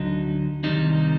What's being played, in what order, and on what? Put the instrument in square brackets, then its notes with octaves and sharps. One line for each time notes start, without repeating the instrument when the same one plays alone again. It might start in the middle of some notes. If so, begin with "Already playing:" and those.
Already playing: [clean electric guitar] D2 D3 F#3 D#4
C2 C3 D#3 G3 D#4